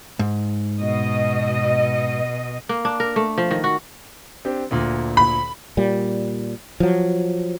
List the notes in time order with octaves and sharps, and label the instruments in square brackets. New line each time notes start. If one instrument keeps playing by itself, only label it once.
[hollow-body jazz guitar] G#2
[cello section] B2 D#5
[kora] A#3
D4
A#4
A3
F3
D#3
F#4
[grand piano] C4 D4 G4
D2 A#2 D3
[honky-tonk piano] B5
[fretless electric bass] A#2 G3
F3 F#3